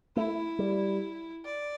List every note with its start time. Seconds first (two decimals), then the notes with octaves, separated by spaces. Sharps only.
0.16 A3 E4
0.59 G3
1.45 D5